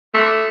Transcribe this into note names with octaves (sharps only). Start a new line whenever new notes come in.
A3